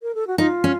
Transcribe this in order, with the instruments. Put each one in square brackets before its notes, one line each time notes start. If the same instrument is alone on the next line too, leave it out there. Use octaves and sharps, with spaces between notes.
[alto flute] A#4
A4
F#4
[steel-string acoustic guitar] D#4 [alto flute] F4
[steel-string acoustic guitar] C#4